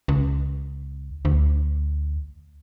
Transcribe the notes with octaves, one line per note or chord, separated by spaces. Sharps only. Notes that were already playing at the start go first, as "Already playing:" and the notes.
C#2
D2